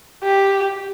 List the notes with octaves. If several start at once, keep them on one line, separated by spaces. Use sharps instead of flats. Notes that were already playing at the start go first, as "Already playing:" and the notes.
G4